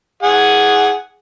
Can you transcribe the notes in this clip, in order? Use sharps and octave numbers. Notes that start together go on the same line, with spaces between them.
G#4 F#5